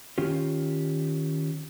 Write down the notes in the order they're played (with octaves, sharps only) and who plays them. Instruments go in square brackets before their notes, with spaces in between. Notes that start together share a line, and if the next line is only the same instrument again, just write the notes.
[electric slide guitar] D#3 C#4 F4 G4